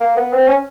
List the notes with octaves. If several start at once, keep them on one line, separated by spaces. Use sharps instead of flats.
A#3
B3
C4
C#4